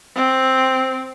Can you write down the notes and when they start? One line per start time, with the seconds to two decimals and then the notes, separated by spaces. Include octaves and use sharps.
0.16 C4